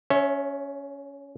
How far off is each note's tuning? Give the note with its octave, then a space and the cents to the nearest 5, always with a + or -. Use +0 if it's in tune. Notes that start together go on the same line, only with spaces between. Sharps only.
C#4 +15 C#5 -25 E5 +0